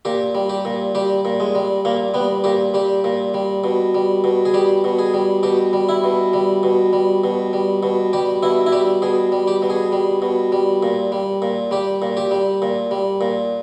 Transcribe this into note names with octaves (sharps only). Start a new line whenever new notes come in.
A#2 G4
G3
G4
A#2
G3 G4
A#2
G#3
G3
A#2 A#3
G3 B3
A#2 G4
G3 G4
A#2
G3
B2
G3
B2
G#4
G3 G4
B2
G#4
G3
B2 G4
G3
E4
B2
G3
B2
G3
B2
G3
B2
G3 G4
B2 E4
E4
G3 G4
B2 G#4
G3
G4
B2
G#4
G3
B2
G3
A#2
G3
A#2
G3 G4
A#2
G4
G3
A#2
G3
A#2